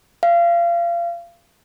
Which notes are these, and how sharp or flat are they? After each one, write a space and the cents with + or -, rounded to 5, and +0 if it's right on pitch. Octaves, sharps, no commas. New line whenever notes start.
F5 -30